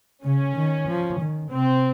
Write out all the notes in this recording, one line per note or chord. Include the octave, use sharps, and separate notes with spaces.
C#3 C#4
D#3
F3
D#3
C3 C4